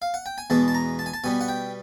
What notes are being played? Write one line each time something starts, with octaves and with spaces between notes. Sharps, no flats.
F5
F#5
G5
G#5
E2 B2 G#3 B3 A5
A5
A#5
A5
G#5
A5
B2 G3 B3 G#5
F#5
G5